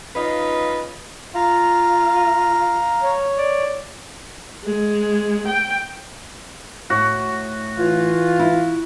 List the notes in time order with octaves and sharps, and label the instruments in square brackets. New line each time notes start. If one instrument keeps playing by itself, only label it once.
[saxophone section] C#4 D#4 F4 B4 D#5 F5
[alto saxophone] F4 [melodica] F5 A#5
[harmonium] C#5
[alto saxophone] D5
[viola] G#3
G5
[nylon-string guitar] A2 [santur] F#4
[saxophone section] E3 F4
[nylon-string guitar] E4